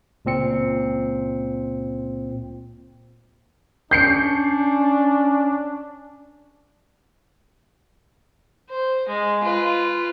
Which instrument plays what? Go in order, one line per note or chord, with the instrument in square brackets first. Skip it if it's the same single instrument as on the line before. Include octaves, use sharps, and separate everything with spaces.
[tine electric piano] C#2 A#2 C4 C#7
[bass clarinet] C#4 [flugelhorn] D4 [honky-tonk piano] G6 C7 C#7
[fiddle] C5
G#3
F4 B4